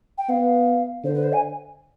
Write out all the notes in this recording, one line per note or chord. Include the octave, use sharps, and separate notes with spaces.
G5
B3 F5
D3 C5
B4
C5
G#5